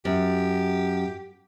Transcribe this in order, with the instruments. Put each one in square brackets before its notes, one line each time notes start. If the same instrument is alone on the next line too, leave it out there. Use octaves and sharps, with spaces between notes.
[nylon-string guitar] F#2 [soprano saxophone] G4